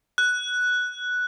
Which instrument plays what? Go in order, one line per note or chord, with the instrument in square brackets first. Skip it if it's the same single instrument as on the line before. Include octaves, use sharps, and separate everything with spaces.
[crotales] F#6